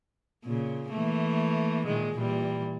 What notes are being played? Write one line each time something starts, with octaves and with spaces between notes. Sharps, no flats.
A#2 C#3
E3 A3 A#3
A#2 D#3 G#3
A#2 E3 G3